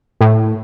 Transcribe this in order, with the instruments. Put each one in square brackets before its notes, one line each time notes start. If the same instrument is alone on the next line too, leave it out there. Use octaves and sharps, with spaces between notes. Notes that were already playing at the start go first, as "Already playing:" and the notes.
[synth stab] A2